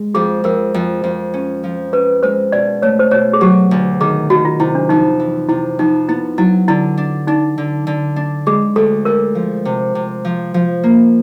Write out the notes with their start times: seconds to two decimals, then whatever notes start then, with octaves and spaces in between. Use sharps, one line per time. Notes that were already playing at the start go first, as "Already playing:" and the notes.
Already playing: G#3
0.15 F2 G#4
0.44 F2 A#4
0.74 F2
1.04 F2
1.34 C#4
1.64 F3
1.93 C#4 B4
2.23 G#3 C5
2.52 B2 D5
2.82 A3 C#5
2.99 C5
3.11 B2 C#5
3.33 G#4
3.41 F#3 G4
3.71 D2
4.00 D#3 G#4
4.30 D#3 F#4
4.45 F4
4.60 C3 E4
4.75 D4
4.89 F2 D#4
5.20 E3
5.49 C3 E4
5.79 F2 D#4
6.09 B3 E4
6.38 F#3 E4
6.68 D3 E4
6.98 D4
7.27 D4 D#4
7.58 D3
7.87 D3
8.16 D4
8.46 G#3 G#4
8.76 D2 A4
9.05 D2 A#4
9.35 F3
9.65 C3
9.95 C3
10.25 F3
10.54 F3
10.83 A#3